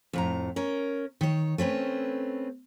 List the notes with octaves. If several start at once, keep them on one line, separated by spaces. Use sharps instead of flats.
F2 A2 A#5
C#4 A#4
D#3 C#5
A3 C4 C#4 B4